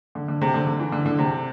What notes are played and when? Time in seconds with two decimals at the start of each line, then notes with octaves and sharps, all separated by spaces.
0.15 D3
0.28 D3
0.42 C3
0.54 D3
0.67 D3
0.79 E3
0.92 D3
1.06 D3
1.19 C3